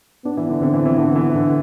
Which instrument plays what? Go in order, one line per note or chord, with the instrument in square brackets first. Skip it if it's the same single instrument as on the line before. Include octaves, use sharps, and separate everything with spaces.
[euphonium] B3 [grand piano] D4
[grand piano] E3
D3
[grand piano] D3 [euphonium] C4
[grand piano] E3
E3
[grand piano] D3 [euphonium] B3
[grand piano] E3
D3